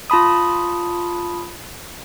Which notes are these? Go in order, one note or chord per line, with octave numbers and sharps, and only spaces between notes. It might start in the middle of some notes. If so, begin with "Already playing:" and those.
F4 A5 B5 D#6